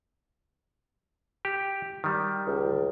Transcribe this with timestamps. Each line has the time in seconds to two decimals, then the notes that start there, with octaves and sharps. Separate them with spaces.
1.45 G4
2.04 D#3 G3
2.47 C#2